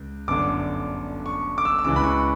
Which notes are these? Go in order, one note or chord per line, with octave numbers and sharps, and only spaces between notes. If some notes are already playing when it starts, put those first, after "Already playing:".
Already playing: C#2
G1 F#2 D3 D6
C#6
D6
E6
E6
C#2 C#3 E3 D6
B5
C#6